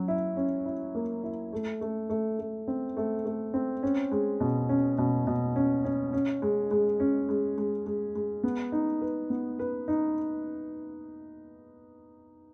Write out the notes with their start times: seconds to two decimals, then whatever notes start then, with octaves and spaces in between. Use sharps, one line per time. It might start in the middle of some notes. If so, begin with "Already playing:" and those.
Already playing: F#3 C#4
0.08 E4
0.37 C#4
0.66 E4
0.95 A#3
1.24 E4
1.53 A3
1.81 A3
2.10 A3
2.39 A3
2.68 C4
2.97 A3
3.25 A3
3.54 C4
3.83 C#4
4.11 G#3
4.40 B2
4.69 C#4
4.98 B2
5.27 B2
5.56 C#4
5.85 C#4
6.13 C#4
6.42 G#3
6.71 G#3
7.00 C#4
7.29 G#3
7.58 G#3
7.86 G#3
8.15 G#3
8.43 B3
8.72 D#4
9.01 B4
9.30 B3
9.59 B4
9.88 D#4